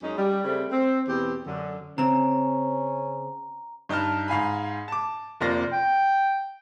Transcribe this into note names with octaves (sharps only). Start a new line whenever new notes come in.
F#2 G#3 C#4 D#4
G3
C#3 G3 A3 C4
C4
E2 B2 C4 G4
F#2 D3
C#3 C4 C#4 A#5
G2 D#4 D#5 A5 F6
G#2 F5 G#5 B5
A5 D6
F1 A#3 C4 F4 D5 A#6
G5